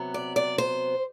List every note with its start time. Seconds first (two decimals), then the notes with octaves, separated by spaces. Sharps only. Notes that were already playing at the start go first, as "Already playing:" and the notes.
Already playing: C3 F#3 B3
0.14 D5
0.36 D5
0.58 C5